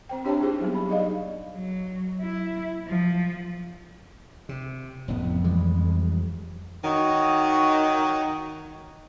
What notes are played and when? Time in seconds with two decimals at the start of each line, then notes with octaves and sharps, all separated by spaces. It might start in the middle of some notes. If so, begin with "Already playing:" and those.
0.09 C4 C5 G5
0.25 D4 G4 C#5 E5 G5 A5
0.41 A#3 D#4 E4 G4 G#4 C5
0.61 F#3 G3 B3
0.75 B5
0.88 D#4 G#4 D5 D#5 F5
1.52 F#3
2.21 E4
2.87 F3
4.49 C3
5.08 F#1 F2 A2 B3
5.44 E3 G3 G#3
6.84 D#3 D#4 F#4 C#5